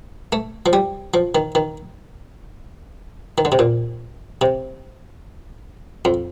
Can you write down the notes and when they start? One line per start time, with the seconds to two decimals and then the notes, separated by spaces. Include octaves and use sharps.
0.32 A3
0.66 F3
0.73 G3
1.14 F3
1.35 D#3
1.55 D#3
3.38 D#3
3.45 D3
3.52 C3
3.59 A#2
4.41 C3
6.05 F2